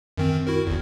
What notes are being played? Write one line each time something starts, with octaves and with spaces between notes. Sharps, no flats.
F#2 D#3 C4
E4 F#4 A#4
G1 E2